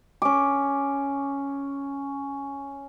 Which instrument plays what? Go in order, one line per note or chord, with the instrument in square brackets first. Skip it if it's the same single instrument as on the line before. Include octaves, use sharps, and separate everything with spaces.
[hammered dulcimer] C#4 D6